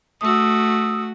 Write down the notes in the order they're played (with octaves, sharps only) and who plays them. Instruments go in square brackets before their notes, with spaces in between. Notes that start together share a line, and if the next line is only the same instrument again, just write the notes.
[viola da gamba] A3 F#4 [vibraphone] D#6 E6